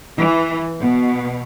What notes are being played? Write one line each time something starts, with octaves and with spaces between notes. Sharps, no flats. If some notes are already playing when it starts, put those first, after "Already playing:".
E3
B2